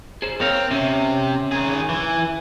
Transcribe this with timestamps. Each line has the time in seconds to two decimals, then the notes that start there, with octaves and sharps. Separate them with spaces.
0.22 G#4 C5
0.41 C4 A#4 C#5 F5
0.71 C3 C#4
1.51 D#3 G#4
1.89 E3